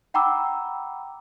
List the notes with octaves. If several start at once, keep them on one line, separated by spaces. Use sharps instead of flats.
F#5 G5 A#5 B5 D6 E6